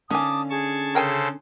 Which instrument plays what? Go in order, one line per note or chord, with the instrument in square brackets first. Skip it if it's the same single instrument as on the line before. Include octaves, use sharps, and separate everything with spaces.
[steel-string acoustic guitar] D3 C#4 F5 [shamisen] D#3 G#5 [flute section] A5 D6 D#6
[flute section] G#4 [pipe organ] A5 C#6
[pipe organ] C#3 A4 C5 [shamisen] A#4 G5 G#5